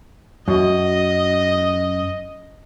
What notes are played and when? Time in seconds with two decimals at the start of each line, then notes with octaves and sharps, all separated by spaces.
0.48 F#2 D#5